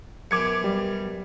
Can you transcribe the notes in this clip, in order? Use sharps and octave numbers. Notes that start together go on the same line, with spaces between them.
F#2 B2 D6 G#6 C#7
G3